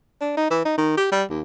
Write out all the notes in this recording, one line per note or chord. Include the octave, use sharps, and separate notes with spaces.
D4
D#4
E3
D#4
D#3
G4
G3
D#2